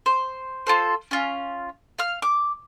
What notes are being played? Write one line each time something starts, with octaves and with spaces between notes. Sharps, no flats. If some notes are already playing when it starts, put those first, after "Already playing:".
C5
F4 A4 C5
C#4 F4
F5 F6
D6